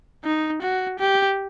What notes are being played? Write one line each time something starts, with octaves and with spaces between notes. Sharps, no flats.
D#4
F#4
G4